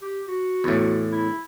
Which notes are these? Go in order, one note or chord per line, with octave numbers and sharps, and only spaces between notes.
G4
F#4
E2 A2
E4